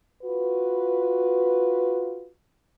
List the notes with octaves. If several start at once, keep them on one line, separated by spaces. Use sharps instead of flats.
F4 F#4 B4